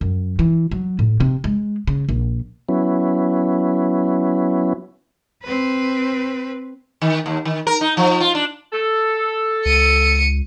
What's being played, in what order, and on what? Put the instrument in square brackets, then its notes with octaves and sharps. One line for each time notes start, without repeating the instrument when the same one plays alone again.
[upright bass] F#2
E3
F#3
A2
C3
G#3
C#3
A#1
[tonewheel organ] F#3 B3 C#4 E4
[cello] C4 B4
[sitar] D#3
D#2
D#3
A#4
D#4
F3
F4
D4
[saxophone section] A4
[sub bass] C#2 [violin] C#7 D#7